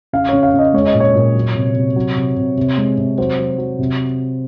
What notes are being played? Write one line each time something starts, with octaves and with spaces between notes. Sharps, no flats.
C#3 F5
C#3 C#5
F5
C#3
D#5
G#3 C#5
D#5
A#2
C#5
A#2
F#3
C3
C3
F#3
C3
C3
C3
G#3
C3
F#3 C5
F#3
F#3
C3